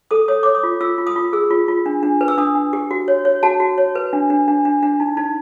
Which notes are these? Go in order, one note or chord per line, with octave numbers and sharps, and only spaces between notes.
A4 D#6
C#5 D#6
C#5 D6
D#6
F4
F4 E6
F4
D#6
F4
G#4 E6
F4
F4
D4
D4
B4
E6
D4 D#6
D4
G4
F#4
C#5
C#5
F#4 A5
F#4
C#5
B4
D4
D4
D4
D4
D4
D#4
D#4